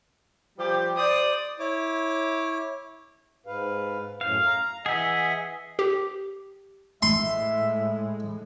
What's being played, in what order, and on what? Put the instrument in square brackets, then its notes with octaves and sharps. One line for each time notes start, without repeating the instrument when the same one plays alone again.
[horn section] F3 G3 G4
[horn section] C5 D5 [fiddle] D#6
[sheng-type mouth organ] E4 C#5 D6
[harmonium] G#2 B4 F5
[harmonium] F#2 A2 [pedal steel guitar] F5
[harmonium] A#5
[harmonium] E3 D#5 F#5 [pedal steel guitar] G#4 E5
[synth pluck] G4
[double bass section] A2 G#3 [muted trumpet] E5 [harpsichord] C6